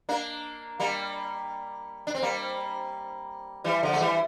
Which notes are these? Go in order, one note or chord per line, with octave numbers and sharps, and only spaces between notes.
A#3 D4
G3 A#3
D4
C4
G3 A#3
E3 G3
D3 F3
A3
E3 G3